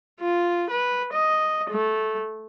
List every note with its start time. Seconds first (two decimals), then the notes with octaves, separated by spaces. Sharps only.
0.21 F4
0.70 B4
1.13 D#5
1.70 A3